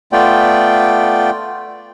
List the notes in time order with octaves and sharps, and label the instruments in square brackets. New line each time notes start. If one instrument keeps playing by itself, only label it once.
[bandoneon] A3 B3 F4 D5 G5